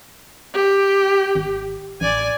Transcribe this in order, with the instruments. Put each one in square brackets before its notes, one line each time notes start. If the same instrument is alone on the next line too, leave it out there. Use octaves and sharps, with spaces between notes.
[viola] G4
[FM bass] G#1
[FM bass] A1 [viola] D5 G#5